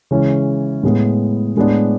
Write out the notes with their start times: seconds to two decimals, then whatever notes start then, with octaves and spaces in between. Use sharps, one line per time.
0.11 C#3 E3 G#3 C#4
0.83 A2 G#3 B3
1.57 A2 G#3 B3 D4